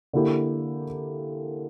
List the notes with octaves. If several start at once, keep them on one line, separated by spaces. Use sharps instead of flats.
D3 A#3 E4 G4